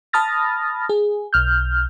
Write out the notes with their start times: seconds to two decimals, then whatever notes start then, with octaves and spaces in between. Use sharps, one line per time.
0.13 A5 B5 D#6 F6 A6 A#6
0.89 G#4
1.33 B1 F6 G6